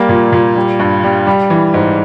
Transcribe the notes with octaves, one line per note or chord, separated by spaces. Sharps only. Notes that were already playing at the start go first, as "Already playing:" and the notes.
Already playing: G3 A#3
A#2
A#2
G3
G2
G3
G3
E3
G#2